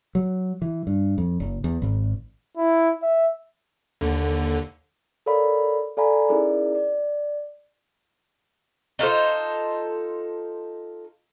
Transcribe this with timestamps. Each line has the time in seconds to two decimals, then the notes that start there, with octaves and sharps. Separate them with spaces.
0.15 F#3
0.62 E3
0.87 G2
1.18 F2
1.40 F#1
1.64 E2
1.82 G#1
2.57 E4
3.03 E5
4.01 D#2 D3
5.26 A4 A#4 C#5 D5 F5 B5
5.97 A4 D5 F5 G#5 A#5 B5
6.29 C#4 D#4 E4 G#4 A#4 D5
6.75 D5
8.99 D#4 F4 A4 C5